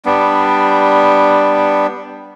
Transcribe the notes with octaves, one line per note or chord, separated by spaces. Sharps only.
G3 B3 D4